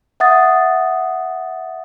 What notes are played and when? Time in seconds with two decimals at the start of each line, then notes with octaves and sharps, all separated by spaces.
0.20 E5 F#5 D#6 A6